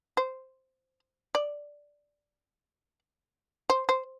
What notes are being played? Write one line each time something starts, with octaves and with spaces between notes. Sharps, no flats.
C5
D5
C5
C5